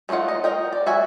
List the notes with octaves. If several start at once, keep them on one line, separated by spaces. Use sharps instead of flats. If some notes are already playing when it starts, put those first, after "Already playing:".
G#3 A3 D#4 F4 F#5
D#5
A#4 D#5 G5
D5
F#4 E5 G#5